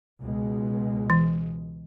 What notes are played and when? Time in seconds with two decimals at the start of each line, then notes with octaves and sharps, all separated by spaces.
0.21 C#2 B2 G#3
1.10 E3